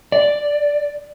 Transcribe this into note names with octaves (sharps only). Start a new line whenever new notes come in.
D5